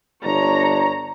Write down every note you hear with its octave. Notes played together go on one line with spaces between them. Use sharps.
G1 D4 C#5 A#5